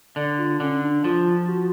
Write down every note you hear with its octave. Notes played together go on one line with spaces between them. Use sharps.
D3 D5
F4
D3 C#4
D4
F3 F4
F#4